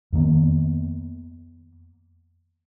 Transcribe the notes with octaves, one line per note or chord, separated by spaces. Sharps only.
F2 D#3 A#3 B3